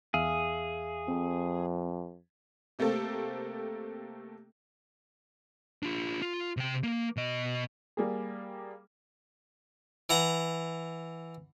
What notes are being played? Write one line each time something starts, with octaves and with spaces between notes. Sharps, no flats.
E2 G#4 E5 F5
F2 C4
C3 A3 A#3 C4 A4
D4 F4
F4
C3 G5
A#3
B2 D#5
G3 A#3 G#4
E3 F#5 A#5